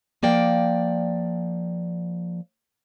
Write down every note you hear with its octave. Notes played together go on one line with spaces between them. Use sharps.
F3 A#3 D5 G5